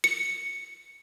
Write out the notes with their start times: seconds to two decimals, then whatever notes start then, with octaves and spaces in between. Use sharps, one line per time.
0.04 C#7